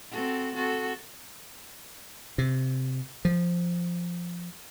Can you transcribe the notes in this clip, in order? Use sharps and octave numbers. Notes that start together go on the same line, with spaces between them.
C4 F#4 A4
C4 F#4 A4
C3
F3